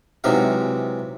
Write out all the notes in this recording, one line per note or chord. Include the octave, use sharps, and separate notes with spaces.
C3 E3 F#3 G#3 D#4 F5